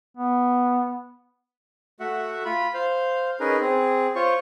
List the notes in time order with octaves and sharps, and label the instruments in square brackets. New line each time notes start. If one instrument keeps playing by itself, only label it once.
[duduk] B3
[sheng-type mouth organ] A3 F#4 E5 F#5
F4 B5
C5 F5
C#4 D#4 G#4 A#4 B4
C4 G#4
F4 C5 C#5 C#6